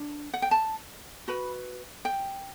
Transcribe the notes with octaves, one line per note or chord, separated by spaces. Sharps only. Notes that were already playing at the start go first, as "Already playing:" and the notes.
Already playing: D4
F#5
G5
A5
F#4 B4 B5
G5